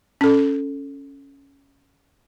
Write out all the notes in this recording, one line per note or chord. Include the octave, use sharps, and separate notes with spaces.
C#4 A4